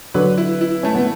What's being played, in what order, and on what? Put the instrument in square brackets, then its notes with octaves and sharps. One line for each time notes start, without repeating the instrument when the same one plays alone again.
[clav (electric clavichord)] D3 F#3 [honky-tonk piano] B4
[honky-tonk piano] E4
E4
[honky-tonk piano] A3 [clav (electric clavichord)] C#4
[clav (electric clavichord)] B3